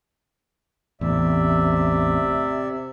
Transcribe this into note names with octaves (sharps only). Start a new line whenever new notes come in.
A1 E2 C3 D5 E5